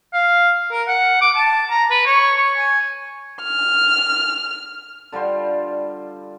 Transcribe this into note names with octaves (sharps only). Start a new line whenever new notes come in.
F5
A#4
F#5
D6
A5
A#5
B4
C#5
C#5
G#5
F6
D3 G3 F4 C5